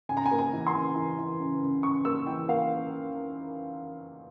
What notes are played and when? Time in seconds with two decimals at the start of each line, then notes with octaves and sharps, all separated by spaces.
0.09 C#3 G#5
0.17 A#5
0.26 G#5
0.31 A#3
0.39 G#5
0.53 E3
0.67 C6
0.74 C#3
0.96 E3
1.18 E3
1.40 C#3
1.62 C#3
1.83 C#3 C#6
2.05 A#3 E6
2.26 E3 G5
2.48 A#3 F5